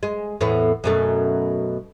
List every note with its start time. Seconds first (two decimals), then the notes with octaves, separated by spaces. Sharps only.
0.03 G#3
0.41 E2 A2 B3
0.84 F#2 B2 A3